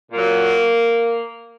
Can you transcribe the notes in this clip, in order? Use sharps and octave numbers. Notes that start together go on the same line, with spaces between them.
A#2 F#3 A#3